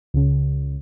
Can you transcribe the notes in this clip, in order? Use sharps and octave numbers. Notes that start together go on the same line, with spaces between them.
C#2 C#3